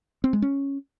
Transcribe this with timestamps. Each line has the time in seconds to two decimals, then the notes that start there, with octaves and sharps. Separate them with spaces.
0.24 C4
0.33 G#3
0.42 C#4